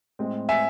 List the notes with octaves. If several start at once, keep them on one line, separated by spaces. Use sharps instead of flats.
A2 G#3 C4
E5 G#5